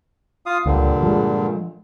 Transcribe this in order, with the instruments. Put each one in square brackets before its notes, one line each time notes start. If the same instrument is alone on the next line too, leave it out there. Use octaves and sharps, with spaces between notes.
[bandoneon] F4 F5 D#6
[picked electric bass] C#2 [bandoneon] G2 A#2 D3
[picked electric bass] F3 G#3